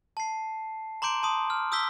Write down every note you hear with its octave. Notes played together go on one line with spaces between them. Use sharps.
A5 C7
A#5 C6 D6 G6 D7
A5 C6 D#6
F6
D#6 E6 G6 B6 G7